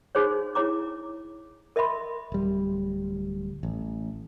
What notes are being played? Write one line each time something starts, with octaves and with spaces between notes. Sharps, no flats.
D#4 F#4 G#4 C5 C#5
E4 G#4 C#5 A#5 D6
A#4 D#5 E5 B5 C6
D1 G3
A1